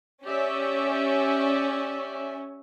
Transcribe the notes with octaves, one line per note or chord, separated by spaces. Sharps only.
C#4 G4 D5 E5